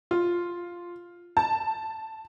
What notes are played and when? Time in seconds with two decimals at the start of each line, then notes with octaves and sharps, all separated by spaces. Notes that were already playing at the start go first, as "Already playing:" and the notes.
0.11 F4
1.37 A5